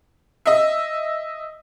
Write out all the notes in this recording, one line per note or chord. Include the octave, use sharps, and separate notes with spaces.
D#5 E5